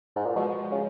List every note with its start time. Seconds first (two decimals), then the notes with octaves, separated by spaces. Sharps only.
0.16 G#2
0.26 A#2
0.35 B2 F3 G#3
0.72 C#3